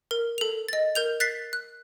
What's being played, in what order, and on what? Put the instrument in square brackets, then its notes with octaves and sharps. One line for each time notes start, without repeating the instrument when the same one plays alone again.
[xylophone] A#4
A4 F7
D#5 A6
A#4 G6 F7
F#6 A6 B6 C7
F#6